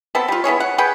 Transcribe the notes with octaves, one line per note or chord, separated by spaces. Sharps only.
B3 C4 A4
G3 F4
B3 E4 G#4 C#5
F#5
G#4 B4 F#5 G5